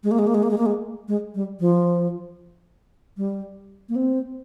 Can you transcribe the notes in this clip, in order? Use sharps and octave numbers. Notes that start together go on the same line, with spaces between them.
G#3
A#3
G#3
A#3
G#3
A#3
G#3
A#3
G#3
G#3
G3
F3
G3
A#3
C4